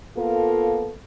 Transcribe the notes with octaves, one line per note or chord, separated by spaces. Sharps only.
A#3 B3 F4 A4